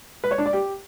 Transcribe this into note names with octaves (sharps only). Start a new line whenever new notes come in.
B4
C#5
D4
D5
G4